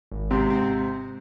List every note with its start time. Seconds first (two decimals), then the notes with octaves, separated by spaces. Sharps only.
0.12 G#1
0.31 G#2 C3 C4
0.50 C4